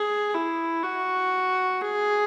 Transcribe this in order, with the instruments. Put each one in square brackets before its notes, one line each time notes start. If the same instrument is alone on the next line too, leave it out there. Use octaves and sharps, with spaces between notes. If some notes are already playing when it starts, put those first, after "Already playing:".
Already playing: [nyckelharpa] G#4
E4
F#4
G#4